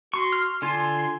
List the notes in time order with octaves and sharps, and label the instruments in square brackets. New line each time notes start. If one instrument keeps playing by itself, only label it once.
[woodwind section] F#4 [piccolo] C6 [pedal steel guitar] C#6
[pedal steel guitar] F6
[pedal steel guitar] D3 F4 [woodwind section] G#5 [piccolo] C6